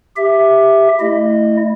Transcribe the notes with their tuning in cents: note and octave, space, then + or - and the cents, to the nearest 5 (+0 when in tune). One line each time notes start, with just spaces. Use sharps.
G4 +10 E5 +0
A3 +0 E4 +0 D#5 -25